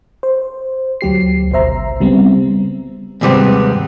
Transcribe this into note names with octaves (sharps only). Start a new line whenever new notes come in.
C5
D2 F#3 G4 C7
G#1 C#2 B2 C5 E5 A#5
C#3 G3 B3 C4
D#2 G#2 C3 G3 B3 C4